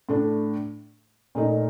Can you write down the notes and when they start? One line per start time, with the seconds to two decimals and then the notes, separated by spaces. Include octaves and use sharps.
0.09 A2 A3 D4
1.35 A#2 A3 D#4